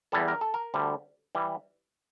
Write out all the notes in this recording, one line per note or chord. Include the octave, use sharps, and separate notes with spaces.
E2 E3 G3 A4
A#4
A4
A#4
D2 D3 G3
E3 G3